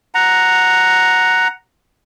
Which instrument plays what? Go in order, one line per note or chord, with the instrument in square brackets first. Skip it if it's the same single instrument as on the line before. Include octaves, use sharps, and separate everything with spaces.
[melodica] F#5 A#5